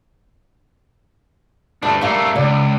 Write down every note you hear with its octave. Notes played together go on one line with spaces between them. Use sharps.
G2 A3 D4 A5
G3 A3 A#3 F5
C#2 D5